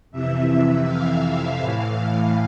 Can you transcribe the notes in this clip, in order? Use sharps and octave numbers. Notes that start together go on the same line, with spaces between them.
F2 C3 E3 E5
F5
A2 E3